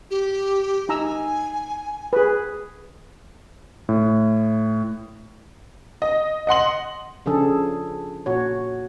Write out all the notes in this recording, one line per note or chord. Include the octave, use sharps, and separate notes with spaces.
G4
D#4 G#5 A#5 E6
G#4 B4
A2
D#5
D#5 F#5 C6 F#7
C#3 F3 D4 G#4 A4
A#2 F#4 C#5